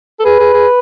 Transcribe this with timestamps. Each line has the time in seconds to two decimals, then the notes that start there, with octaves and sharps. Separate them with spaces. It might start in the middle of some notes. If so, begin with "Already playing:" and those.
0.20 A4
0.25 G#4 B4
0.39 G#4
0.54 G#4